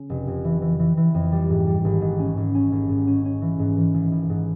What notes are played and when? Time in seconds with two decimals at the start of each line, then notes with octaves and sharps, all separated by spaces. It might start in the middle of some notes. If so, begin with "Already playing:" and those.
Already playing: C#3
0.10 F1
0.27 F2
0.45 E3
0.62 E3
0.79 E3
0.97 E3
1.14 F2
1.32 G3
1.50 G#2
1.67 G3
1.85 G#1
2.01 G#2
2.19 C#4
2.37 G#1
2.54 C#4
2.72 G#1
2.89 G#2
3.07 C#4
3.25 C#4
3.42 E3
3.59 G#2
3.77 E3
3.94 G#1
4.12 G#1
4.29 G#2